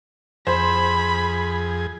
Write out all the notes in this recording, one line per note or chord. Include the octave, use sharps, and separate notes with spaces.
F2 G#4 C5 B5